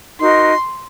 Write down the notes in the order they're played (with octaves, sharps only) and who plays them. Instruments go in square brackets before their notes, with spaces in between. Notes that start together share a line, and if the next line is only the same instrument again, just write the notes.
[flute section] D#4 F#4 A#4 D#5 [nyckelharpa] C6